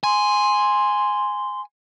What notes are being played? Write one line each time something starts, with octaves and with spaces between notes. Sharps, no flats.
G#5 C6